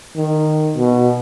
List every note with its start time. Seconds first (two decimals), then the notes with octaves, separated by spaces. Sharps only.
0.16 D#3
0.77 B2